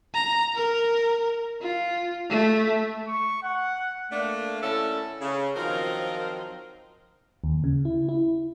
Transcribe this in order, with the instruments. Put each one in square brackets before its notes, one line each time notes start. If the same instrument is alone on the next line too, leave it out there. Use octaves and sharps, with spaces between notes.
[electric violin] A#5
A#4
F4
A3
[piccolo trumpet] C#6
F#5
[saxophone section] A3 A#3 D4
D3 A3 C#4 E4 A4
C#3
D#3 F3 F#3 C4 F4 A#4
[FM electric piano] D#2
C#3
E4
E4